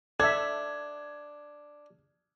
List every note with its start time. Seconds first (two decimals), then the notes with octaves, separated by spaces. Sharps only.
0.20 D4 A4 E5 G#6